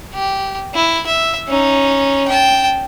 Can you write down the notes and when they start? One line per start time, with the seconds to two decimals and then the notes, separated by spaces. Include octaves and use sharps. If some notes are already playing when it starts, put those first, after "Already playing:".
0.14 G4
0.74 E4
1.06 E5
1.48 C#4 D#4
2.28 G5 A5